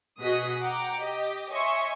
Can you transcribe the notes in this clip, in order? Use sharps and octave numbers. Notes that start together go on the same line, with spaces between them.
B2 F#4 G#4 D#5 D#6 B6
F#5 G5 A#5 D6
G4 D#5
C#5 D#5 E5 G#5 C6 C#6